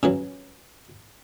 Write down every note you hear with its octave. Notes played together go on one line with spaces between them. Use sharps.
C#3 E3 F#3